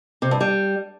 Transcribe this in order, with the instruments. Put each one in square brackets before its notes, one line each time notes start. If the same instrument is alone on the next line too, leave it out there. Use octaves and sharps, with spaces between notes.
[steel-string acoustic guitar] C3
G2
G3